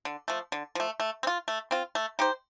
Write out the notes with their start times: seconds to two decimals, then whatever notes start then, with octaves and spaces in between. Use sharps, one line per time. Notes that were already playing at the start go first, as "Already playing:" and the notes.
0.05 D3
0.28 F3 A3
0.52 D3
0.75 F3 A3
1.00 A3
1.23 C4
1.27 F4
1.48 A3
1.71 C4 F4
1.95 A3
2.19 D#4 G4 C5